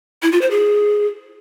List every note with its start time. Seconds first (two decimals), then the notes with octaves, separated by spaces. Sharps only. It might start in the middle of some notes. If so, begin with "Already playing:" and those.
0.23 E4
0.32 F4
0.41 C5
0.51 G#4